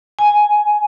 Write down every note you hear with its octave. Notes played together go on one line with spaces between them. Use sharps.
G#5